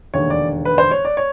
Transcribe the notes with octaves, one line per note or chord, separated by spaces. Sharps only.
E1 D#2 D3 C#5
D5
B4
C5
C#5
D5
C#5